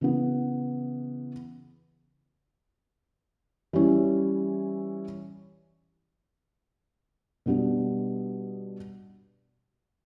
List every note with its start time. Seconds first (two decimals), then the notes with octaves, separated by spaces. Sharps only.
0.01 C#3 E3 B3
3.73 E3 G3 C#4 E4
7.46 B2 G3 B3 D4